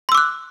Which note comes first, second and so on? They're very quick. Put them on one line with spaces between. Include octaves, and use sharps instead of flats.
C6 E6 D6 F#6